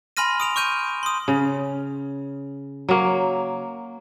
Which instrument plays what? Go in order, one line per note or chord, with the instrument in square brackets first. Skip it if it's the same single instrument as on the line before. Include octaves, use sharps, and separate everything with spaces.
[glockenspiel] G#5 B5 C6 F6 A#6 D#7
D#6 D7 F7
C#6 F6 G6 D#7
C6 D#6
[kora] C#3
F#3 A#3